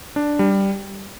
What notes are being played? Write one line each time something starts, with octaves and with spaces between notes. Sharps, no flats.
D4
G3